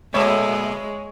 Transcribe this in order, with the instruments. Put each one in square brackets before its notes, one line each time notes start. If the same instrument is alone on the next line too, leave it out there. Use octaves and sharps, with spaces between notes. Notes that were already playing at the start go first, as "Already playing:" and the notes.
[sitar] A#2 A3 E5 [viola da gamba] G#3 [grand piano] C#5